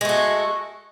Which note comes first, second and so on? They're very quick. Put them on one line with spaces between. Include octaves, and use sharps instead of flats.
G#3 A3 F#4